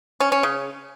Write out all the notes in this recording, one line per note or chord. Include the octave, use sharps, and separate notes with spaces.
C#4
C#4
C#3